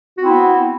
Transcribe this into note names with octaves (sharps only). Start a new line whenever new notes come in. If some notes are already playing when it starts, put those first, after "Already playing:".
B3 C4 E4 F#4